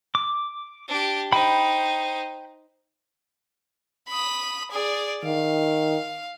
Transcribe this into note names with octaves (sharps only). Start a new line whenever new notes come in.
D6
D4 G4
D#4 C5 G5 B5
B5 D#6
G#4 D5
D#3 F5